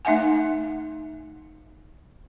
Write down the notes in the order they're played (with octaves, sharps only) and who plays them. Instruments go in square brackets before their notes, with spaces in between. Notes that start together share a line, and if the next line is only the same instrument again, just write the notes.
[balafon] A3 D#4 E5 F#5 G#5